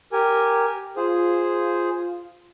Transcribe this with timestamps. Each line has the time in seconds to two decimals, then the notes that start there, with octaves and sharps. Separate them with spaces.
0.13 G4 A#4 G#5
0.97 F4 G#4 C5